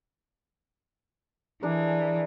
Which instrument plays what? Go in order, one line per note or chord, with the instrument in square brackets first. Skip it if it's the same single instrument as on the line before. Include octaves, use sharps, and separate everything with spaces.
[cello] E3 [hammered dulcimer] D4 G#4 A#4